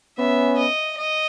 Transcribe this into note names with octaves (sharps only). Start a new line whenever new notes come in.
B3 C#4 E5
D#5
D#5